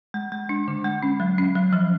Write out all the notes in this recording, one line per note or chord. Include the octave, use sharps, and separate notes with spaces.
G#3
G#3
D4
D3
G#3
C#4
F#3
C#4
F#3
F3